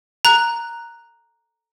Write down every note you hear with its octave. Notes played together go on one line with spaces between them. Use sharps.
A#5 F#6